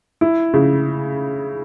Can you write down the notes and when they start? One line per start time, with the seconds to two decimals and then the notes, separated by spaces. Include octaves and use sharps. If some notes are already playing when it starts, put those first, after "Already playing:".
0.21 E4
0.54 C#3